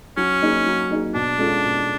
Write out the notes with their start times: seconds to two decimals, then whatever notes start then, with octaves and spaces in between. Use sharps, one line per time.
0.17 F#3 C#4
0.42 A#3 D#4 G#4
0.66 F#3
0.90 A#3 D#4 G#4
1.14 B2 D4
1.39 G#3 C#4 F4 A4
1.64 B2